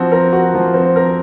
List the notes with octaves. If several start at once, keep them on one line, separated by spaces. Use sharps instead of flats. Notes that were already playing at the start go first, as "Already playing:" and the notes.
Already playing: F3 C4 F#4
A#4
F#4
F3
C4
A#4